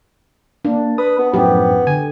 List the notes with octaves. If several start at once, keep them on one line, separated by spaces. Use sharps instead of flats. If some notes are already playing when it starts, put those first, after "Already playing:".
A#3 D4
B4 D#6
B3
F#2 A2 F3 B3 G4
D3 G#5